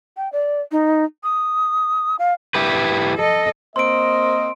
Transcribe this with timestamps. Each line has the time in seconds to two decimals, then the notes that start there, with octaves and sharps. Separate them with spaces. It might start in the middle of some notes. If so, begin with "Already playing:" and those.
0.17 G5
0.32 D5
0.71 D#4
1.23 D#6
2.19 F5
2.55 E4 G4 B4
3.16 A4 D#5
3.76 A#3 C4 D#5 C6 D7